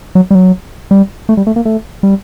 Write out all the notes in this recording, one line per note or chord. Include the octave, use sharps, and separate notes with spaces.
F#3
G3
F#3
G3
A3
G3
A3
A#3
A3
G3